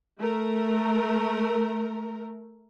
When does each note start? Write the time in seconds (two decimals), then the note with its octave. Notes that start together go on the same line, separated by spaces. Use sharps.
0.20 A3 A#4